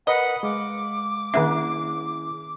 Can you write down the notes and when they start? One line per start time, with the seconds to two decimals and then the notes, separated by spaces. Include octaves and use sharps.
0.07 A#4 B4 D#5 F#5 B5
0.43 G#3 F5 D6
1.34 D#3 A#3 C#4 D4 E4 G#4 E5